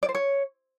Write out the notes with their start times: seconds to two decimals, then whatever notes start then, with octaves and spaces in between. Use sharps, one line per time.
0.03 D5
0.09 C5
0.15 C#5